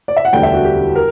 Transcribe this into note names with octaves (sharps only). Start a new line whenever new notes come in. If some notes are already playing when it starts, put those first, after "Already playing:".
D5
E5
F#5
E1 D2 D3 G3 G5
E5
F#4
G4
A#4